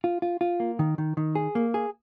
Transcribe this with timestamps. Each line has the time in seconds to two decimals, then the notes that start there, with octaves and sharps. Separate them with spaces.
0.04 F4
0.22 F4
0.41 F4
0.60 A#3
0.79 D#3
0.98 D#3
1.17 D#3
1.35 G#4
1.55 A#3
1.74 G#4